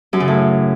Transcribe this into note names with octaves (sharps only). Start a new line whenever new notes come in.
F#2
C#3
A2